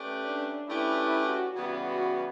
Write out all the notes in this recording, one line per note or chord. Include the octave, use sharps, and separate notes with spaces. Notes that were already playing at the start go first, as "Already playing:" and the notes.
Already playing: A3 C#4 G4 B4 D5
D4
A3 C#4 E4 G4 B4 D5
E4
F#4
C#3 E3 G3 B3 F#4
F#4